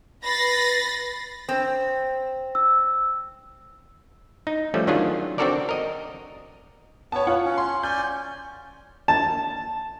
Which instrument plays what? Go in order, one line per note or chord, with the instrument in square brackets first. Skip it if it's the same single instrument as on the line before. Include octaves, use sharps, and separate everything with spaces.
[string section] B4 B5 A6 A#6 C7
[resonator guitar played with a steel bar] C4
[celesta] E6
[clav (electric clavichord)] D#4
F3 G3 A3 C#4
D#3 F#3 C#4 D4 F4 G#4
C4 D4 F#4 A4 A#4 D5
A#4 D#5
[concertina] B3 [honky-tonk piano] C#5 A5
[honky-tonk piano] F4 C#5 F#5
[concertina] C#4
[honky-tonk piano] C6
[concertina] C#4 D5 G#5 [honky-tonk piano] G6
[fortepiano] A5